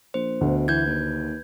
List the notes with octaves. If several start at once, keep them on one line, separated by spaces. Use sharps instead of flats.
A#1 C5
D2 B2
E3 B4 G6 G#6
D#2